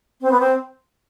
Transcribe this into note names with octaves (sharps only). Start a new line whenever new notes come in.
C4
B3
C4